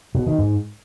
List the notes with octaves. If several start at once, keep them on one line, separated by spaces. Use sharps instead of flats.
B2
D#3
G#2